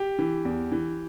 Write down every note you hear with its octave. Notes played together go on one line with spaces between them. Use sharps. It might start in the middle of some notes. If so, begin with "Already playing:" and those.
Already playing: G4
E3
E2
E3